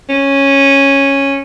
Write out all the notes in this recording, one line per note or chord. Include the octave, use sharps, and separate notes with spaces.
C#4